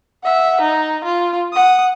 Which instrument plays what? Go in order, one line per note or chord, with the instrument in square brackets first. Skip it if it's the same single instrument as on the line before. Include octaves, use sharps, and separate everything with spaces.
[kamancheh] E5 F#5
D#4
F4
F#5 D#6